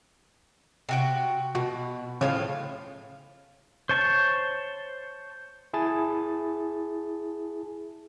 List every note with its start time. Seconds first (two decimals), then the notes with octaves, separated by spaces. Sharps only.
0.89 C3 F#4 G5
1.55 B2 F#4
2.21 A2 C#3 F3 C#4 F4 G#5
3.89 C5 C#5 A5 C#6
5.73 E4 G#4 G#5 A5 A6